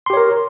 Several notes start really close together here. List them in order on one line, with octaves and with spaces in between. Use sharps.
C6 G4 C#5 A#4